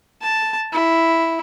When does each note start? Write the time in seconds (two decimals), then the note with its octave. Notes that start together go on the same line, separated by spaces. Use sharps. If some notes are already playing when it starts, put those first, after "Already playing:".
0.22 A5
0.73 E4